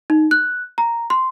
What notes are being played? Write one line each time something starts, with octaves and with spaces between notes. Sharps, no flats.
D#4
F#6
A#5
C6